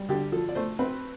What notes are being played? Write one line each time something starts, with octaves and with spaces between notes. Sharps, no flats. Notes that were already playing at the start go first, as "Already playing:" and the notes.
Already playing: G3
D3 G4
F3 A4
D5
A3 C5
C4 B4